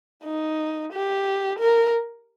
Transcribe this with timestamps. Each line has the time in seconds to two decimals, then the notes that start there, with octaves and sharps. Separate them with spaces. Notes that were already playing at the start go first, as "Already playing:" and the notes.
0.25 D#4
0.93 G4
1.59 A#4